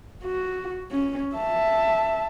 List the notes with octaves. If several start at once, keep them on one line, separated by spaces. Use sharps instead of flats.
F#4
C#4
E5 A5